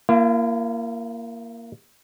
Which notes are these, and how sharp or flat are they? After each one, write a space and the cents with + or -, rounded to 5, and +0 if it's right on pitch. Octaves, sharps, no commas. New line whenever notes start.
A#3 +0 E4 +45